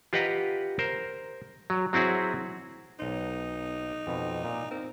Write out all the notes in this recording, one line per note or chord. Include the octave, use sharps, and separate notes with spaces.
F4 G4 B4 D#5 F#5 A#5
A#4 C5
F#3
F#3 C4 E4 F#4 G#4
B1 D#4 C5
F2 B2
A#2
C4 A#4